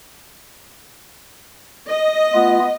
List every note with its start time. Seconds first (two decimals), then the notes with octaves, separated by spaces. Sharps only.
1.87 D#5
2.34 A3 B3 F4